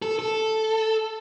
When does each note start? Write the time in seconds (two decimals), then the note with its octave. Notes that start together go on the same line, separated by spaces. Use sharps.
0.02 A4
0.19 A4